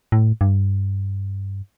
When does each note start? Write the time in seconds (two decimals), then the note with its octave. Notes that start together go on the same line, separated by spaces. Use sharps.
0.12 A2
0.41 G2